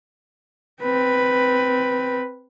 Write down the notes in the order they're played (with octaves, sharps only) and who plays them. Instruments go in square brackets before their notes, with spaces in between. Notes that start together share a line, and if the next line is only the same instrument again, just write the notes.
[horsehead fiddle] C4 B4